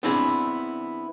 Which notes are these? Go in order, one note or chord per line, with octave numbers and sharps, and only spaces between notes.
B3 C4 D4 E4 G#4